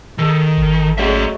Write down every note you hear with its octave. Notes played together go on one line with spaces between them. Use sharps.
D#3 A4
G#1
F#3 G#3 A3 C#4 E5